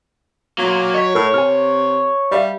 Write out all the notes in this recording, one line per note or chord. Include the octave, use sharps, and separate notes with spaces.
F#3 A#3 F4
C#5 D#5 B6
A2 A#4 E6
C3 G#5 F6
G3 D5 E5 F5